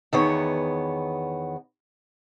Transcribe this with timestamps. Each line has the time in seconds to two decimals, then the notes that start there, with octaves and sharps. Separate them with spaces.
0.13 E2 D#3 B3 C#5